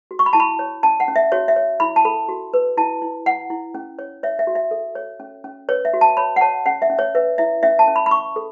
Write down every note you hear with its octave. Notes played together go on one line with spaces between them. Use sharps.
F#4
C#6
B5
E4 A5
B5
C#5
C#4 A5
F#5
C#4
E5
F#4 C#5
E5
C#5
E4 B5
A5
A4 B5
F#4
B4
E4 A5
E4
E4 F#5
E4
C#4
C#5
C#5 E5
E5
F#4
E5
A4
C#5
C#4
C#4
B4 C#5
E5
F#4
A5
C#5 B5
F#5
C#5 A5
C#4 F#5
E5
C#4
C#5
B4 E5
E4 E5
C#4 E5
A5
C#4
B5
B5
C#4 C#6
A4